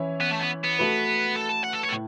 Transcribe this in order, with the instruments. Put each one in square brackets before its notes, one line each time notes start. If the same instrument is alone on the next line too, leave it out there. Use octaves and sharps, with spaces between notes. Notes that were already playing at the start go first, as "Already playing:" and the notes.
Already playing: [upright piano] E3 C#4 E4 C#5
[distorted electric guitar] B3
A3
B3
B3
[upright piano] A3 F#4 B4
[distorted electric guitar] A4
A5
F#5
A4
C#5
A4
[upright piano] A2